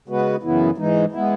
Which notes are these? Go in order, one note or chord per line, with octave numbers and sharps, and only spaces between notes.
C#3 G#3 B3 F#4 B4
F#2 C#3 E3 B3 E4
G#2 E3 G#3 D#4
G#3 B3 E4